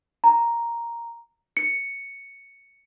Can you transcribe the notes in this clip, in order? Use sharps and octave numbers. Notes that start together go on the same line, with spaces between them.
A#5
C#7